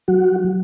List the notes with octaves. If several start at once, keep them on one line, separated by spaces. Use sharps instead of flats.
F#3 F#4